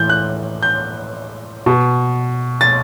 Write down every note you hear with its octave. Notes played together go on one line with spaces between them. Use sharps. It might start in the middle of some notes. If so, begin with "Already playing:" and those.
Already playing: A2 E3 G6
F#6
G6
B2
A6